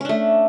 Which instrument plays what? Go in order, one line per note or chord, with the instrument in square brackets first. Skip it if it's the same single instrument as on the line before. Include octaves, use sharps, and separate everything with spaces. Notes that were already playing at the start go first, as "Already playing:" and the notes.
[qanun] C#4
D4
A3